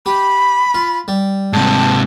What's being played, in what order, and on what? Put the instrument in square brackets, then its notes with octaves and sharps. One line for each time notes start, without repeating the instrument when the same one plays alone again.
[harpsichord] G4 [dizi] B5
[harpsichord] F4
G3
[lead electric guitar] G#2 C3 [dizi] A5